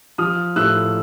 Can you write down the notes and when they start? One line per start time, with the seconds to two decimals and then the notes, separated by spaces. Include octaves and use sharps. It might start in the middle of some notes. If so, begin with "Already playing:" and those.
0.18 F3 D#6 F6
0.56 A2 E6 F#6